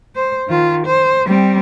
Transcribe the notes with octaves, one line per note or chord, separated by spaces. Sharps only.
C5
D#3 F4
C5
G3 C4